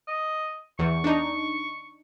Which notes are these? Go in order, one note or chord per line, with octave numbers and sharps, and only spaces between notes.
D#5
E2 C#6
D4 D#4